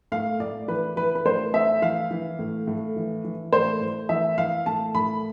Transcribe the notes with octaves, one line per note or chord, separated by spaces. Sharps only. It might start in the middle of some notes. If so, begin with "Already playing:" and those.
A2 F5
A2 D5
E3 B4
E3 B4
B4
A2 C5
A2 E5
E3 F5
E3
A2
A2
E3
E3
A2 C5
A2
E3 E5
E3 F5
A2 A5
A2 B5